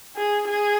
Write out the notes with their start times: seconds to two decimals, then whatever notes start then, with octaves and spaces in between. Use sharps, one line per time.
0.16 G#4
0.47 G#4